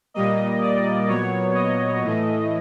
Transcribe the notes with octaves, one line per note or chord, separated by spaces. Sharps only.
A#2 G3 A#3 D#5
D5
A#2 F#3 B3 C#5
D#5
A2 E3 A3